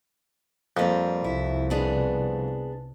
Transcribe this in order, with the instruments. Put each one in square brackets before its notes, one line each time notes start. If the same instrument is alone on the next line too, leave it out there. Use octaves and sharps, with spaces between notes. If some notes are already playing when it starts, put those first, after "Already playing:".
[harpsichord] F2 [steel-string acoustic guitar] G3 A#3 C4
[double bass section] C2 [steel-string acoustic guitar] E4
[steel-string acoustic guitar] B3 D4 G#4